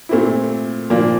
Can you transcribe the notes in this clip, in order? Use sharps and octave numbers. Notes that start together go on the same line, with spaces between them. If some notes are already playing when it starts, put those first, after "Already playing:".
A#2 A3 C4 E4
A#2 F3 A#3 D4